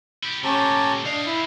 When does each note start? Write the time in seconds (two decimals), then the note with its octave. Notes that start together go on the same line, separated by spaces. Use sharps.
0.23 E4 G4
0.44 A#2 A3 C#4 G4 A5 A#5
1.06 G3 D4 D#5 F5
1.26 E4